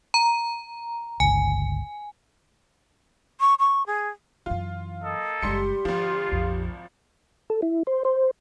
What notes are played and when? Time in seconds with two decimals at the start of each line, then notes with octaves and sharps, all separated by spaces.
0.14 A#5
1.20 G1 C#2 G#5
3.40 C#6
3.59 C#6
3.87 G#4
4.46 F#2 E3 F4
5.03 A#3 A4 D#5
5.42 F#1 G3 G#3 G4 C6 C#7
5.85 G#1 D3 F3 F4
6.32 A#1 F2
7.50 A4
7.62 E4
7.87 C5
8.05 C5